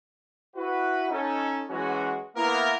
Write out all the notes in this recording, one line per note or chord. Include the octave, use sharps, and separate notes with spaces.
E4 F#4 B4
C#4 D#4 A4
E3 F#3 G#3 C#4 F#4
A#3 B3 E4 A#4